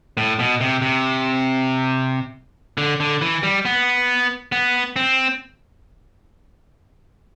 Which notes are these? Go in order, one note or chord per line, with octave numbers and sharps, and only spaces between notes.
A2
B2
C3
C3
D3
D3
E3
G3
B3
B3
C4